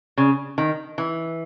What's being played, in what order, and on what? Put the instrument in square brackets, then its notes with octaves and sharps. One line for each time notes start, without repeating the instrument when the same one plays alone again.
[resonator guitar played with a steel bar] C#3
D#3
E3